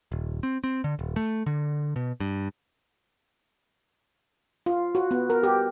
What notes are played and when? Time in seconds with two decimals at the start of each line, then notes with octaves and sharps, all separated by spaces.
0.12 D#1
0.43 C4
0.64 C4
0.84 D3
0.99 D#1
1.16 A3
1.46 D3
1.96 B2
2.20 G2
4.66 F4
4.95 F#4
5.11 B3
5.30 A#4
5.43 G4